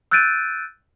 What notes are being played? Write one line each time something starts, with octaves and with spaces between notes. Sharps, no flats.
E6 F#6 G6 A6 D7 D#7